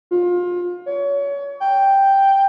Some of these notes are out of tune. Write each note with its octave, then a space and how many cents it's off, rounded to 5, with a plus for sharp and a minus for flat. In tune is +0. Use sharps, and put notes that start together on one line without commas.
F4 +25
C#5 +30
G5 +0